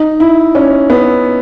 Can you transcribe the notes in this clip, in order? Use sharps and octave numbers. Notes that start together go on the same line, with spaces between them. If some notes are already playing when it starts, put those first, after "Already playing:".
Already playing: D#4
E4
C#4
B3